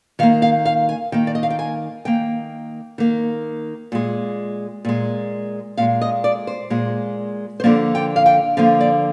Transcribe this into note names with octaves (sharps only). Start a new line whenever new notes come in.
D#3 A#3 F5
F5
F5
G#5
D#3 A#3 G5
D5
D#5
F5
G5
G#5
D#3 A#3 G5
D#3 A#3
A#2 G#3
A#2 G#3
A#2 G#3 F5
D#5
D5
C5
A#2 G#3
C5
D3 F3 A#3 D5
G5
F5
G5
D3 F3 A#3 F5
D5